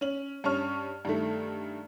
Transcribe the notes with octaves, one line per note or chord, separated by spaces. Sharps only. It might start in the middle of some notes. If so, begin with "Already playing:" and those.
C#4 F#7
G2 C#4 A5 C#6 F6
G2 D#3 A3